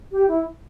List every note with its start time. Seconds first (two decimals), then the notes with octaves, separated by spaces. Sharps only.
0.12 G4
0.28 E4